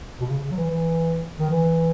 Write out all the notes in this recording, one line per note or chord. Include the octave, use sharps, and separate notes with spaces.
B2
C#3
C#3
F#3
E3
E3
D#3
E3